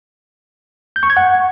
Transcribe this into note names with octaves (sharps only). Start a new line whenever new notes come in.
G6
C#6
G#6
F#5